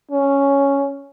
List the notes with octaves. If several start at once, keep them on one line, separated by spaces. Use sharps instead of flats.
C#4